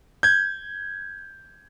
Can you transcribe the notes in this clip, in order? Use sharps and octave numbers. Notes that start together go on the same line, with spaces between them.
G6 G#6